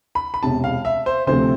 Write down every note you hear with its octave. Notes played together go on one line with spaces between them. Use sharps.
B5
B5
E1 E2 C3 A5
F5
E5
C5
D2 C3 F3 A3 C4 C5